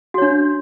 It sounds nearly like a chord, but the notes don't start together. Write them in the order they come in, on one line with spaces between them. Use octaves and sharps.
F#4 C#5 D4